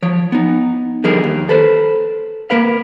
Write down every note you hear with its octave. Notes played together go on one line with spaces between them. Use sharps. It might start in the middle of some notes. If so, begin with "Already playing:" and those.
F3 C#5
B3 D#4
D3 F3 G3 D#4 G#4 A#4
D#2
A4 B4 C5
A#3 A#4 B4 F5